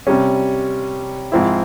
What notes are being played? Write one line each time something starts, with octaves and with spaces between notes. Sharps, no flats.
C3 G3 C#4
G#2 F3 C4 E4